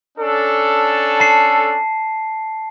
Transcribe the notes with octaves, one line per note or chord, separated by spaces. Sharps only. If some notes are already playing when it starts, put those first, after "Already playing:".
C#4 D4 A4
A5 C7